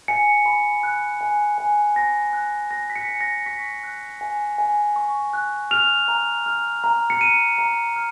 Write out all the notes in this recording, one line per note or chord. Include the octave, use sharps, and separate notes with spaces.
G#5 C#7
B5
F#6
G#5
G#5
B5 A#6
F#6
G#5 A#6
B6
C#7
G#5
A#6
C#6 B6
F#6
G#5
G#5
C#6
F#6
F6 F7
A#5
F6
A#5
C#7
F6 D#7
A#5
F6